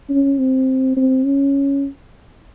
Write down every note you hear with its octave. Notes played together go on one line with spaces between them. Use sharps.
C#4
C4
C4
C#4